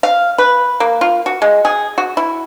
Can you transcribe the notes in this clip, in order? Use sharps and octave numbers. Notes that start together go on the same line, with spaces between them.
F5
B4
A#3
F4
F#4
G#3
G#4
F#4
E4